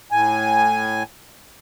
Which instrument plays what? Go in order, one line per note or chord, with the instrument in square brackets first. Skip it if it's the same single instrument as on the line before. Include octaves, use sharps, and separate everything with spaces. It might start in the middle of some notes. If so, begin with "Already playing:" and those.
[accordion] A2 G#5